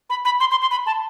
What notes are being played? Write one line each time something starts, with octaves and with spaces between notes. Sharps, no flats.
B5
B5
C6
C6
C6
B5
A5